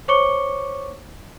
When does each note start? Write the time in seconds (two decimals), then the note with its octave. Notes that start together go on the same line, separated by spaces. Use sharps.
0.08 C5 C#5 C#6 D6 C#7 G7